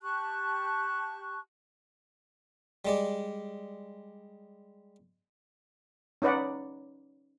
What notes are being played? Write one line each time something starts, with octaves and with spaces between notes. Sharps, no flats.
G4 A5 C#6 F#6
G3 G#3 D5
C#4 D#4 B4 D5 F#5